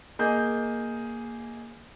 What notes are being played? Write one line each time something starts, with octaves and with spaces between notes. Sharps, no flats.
A#3 G#4 D#5 G6